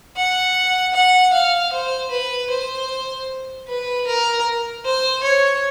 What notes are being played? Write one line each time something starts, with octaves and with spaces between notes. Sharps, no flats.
F#5
F#5
F5
C5
B4
C5
B4
A#4
C5
C#5